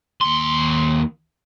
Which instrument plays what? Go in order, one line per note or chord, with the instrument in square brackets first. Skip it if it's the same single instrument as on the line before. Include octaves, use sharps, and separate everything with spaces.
[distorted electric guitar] D#2 C6